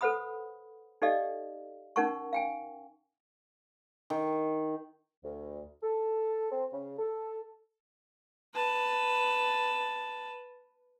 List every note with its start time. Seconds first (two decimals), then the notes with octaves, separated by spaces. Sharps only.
0.01 A4 B4 C5 F#5 B5 D#6
1.02 D#4 G4 A4 D5 D#5 F5
1.96 C#4 D#4 A#4 F#5 A5 C#6
2.33 F5 G5 G#5
4.10 D#3
5.24 D2
5.83 A4
6.52 C4
6.73 C#3
6.99 A4
8.54 B4 A5